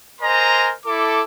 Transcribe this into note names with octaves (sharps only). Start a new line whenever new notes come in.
A#4 C5 D#5 G#5 A#5 C6
E4 A4 D6